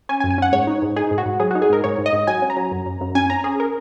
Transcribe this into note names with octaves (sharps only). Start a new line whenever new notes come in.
C#4 G#5
G#5
F#2
G#5
C#4 F#5
G#2 C#5
D#4
G#2
D#4 G#4
G#2
F#4
G#2
F#3 G#4
D#4 F#4
G#4
G#2 A#4
G#2 C#5
G#2
D#5
G#2
F#3 G#5
C#4
A#5
F#3
F#2
F#2
F#2
C#4 G#5
C#4 A#5
C#4 G#4
A#4